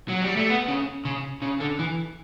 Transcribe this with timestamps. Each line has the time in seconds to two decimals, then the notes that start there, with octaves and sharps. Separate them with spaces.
0.09 F#3
0.23 G3
0.37 A3
0.50 B3
0.68 C#3
1.05 C#3
1.42 C#3
1.60 D3
1.79 E3